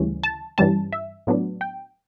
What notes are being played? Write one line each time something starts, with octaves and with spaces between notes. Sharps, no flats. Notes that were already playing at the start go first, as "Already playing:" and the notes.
Already playing: D2 C#3 E3 G3 C#4
A5
G2 E3 G3 C#4 A5
E5
A2 F#3 B3 D4
G5